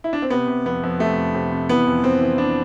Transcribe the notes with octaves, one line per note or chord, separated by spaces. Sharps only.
E4
D4
C4
C3 B3
C3
F2 B3
F2
C3 A3
F2
C3
C3
E3 B3
F2
F2 C4
E3
E3 D4